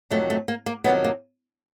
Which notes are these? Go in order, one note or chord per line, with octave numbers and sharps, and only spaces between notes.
F2 C3 D#3 F#3 A3
A3
A#3
A#3
F2 C3 D#3 F#3 B3
A#3